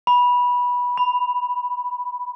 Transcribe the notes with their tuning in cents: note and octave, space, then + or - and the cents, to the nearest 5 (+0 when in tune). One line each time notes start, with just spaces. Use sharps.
B5 -15
B5 +10